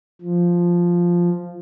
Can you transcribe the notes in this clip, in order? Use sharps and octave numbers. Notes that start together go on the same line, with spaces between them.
F3